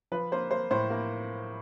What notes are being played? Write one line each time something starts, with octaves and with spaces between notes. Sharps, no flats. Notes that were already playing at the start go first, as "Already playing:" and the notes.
F3 B4
A#3 C5
A#3 C5
A2 C5
A#3